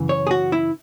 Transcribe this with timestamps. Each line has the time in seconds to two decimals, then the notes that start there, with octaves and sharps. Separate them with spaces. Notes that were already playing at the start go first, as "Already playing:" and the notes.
Already playing: F#2 C#3 E3
0.09 C#5
0.27 G#4
0.31 F#4
0.52 E4